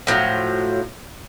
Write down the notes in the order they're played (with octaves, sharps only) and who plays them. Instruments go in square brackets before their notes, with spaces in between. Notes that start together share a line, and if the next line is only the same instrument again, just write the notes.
[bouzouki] A2 F3 F#3